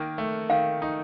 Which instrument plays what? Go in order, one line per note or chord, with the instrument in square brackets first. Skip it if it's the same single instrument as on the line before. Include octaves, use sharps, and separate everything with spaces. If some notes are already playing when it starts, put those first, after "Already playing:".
Already playing: [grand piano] D#3 A#3
A3
[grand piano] D#3 [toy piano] F5
[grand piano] D#4